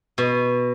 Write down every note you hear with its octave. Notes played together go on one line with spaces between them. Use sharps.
B2